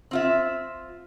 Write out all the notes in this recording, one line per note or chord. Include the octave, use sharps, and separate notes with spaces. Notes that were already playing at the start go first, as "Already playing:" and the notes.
C4 F4 E5